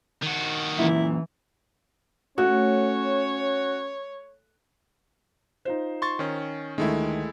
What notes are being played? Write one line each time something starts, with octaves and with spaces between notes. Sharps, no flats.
D#3 F#4
F#2 A#2 E3 E4
A3 C#4 F#4 C#5
D#4 F4 C5
C6 C#6 A6
D#3 C#4
D2 D#3 G#3 A3 E4